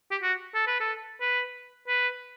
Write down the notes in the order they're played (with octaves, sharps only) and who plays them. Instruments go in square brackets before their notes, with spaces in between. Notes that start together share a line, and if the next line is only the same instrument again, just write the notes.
[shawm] G4
F#4
A4
B4
A4
B4
B4